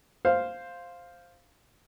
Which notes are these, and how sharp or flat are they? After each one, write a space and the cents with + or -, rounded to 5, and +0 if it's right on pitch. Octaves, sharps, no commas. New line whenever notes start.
C5 +0 F5 +0